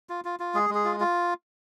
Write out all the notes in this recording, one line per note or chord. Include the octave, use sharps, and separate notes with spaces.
F4
F4
F4
G#3 G#4
G#3 G#4
F4
F4